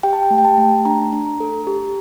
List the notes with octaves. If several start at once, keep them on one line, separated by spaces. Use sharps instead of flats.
G4 G5
A5
G5
A3
G5
A5
A3
D4 A#5
D4
A4
G4